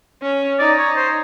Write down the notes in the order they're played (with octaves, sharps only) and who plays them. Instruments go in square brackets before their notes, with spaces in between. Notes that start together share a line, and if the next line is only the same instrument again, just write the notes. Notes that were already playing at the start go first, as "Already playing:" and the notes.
[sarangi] C#4
[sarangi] D#4 [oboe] D5
[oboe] C#5
C5